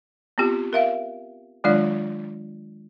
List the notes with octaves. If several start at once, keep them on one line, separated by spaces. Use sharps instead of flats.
B3 C4 F4 G4
A#4 E5 F5
D#3 F#3 G#3 D4 F4 D5